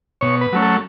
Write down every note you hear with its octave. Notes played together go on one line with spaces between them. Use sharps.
B2 C#5
B4
F#3 A3 C#4
A4